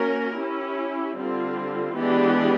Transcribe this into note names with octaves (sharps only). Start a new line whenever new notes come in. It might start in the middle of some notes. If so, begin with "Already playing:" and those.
Already playing: A#3 C#4 F#4 A#4
C#4 E4 G4
D3 G3 C4 F4
E3 G#3 B3 D4 G4